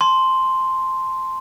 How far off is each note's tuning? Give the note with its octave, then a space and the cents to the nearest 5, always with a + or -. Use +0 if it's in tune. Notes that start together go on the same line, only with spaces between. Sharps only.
A5 -10 C6 +0